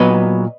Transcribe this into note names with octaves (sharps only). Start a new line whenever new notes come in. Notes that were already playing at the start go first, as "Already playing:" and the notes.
Already playing: A#2 F#3 B3 B4 D#5